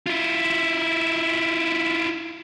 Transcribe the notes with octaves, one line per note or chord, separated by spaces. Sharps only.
E4 F4